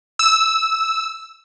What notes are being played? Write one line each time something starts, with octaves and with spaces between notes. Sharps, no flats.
E6